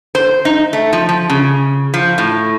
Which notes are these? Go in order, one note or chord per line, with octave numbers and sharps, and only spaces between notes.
C5
D#4
A3
F3
F3
C#3
F3
A2